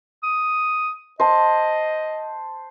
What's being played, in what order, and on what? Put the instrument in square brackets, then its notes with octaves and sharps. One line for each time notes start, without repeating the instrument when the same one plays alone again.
[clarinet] D#6
[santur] C5 A5 [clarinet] D#5